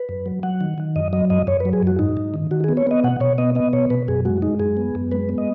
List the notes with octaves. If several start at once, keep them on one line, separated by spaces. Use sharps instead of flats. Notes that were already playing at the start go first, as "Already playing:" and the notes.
Already playing: B4
F#2
F#3
F#3 F#5
D#3
D#3
F#2 D#5
F#3 D#5
F#2 D#5
F#2 C#5
B4
F#3
G#4
F#2 F#4
G#2 D#4
G#2
D#3
D#3 F#4
G#4
B3
C#5
B3 D#5
B2 F#5
B2 C#5
B3 D#5
B3 D#5
B2 C#5
B2 B4
F#2 G#4
G#3 F#4
G#3 D#4
F#2 G#4
B3
F#2
G#3 B4
B3
D#5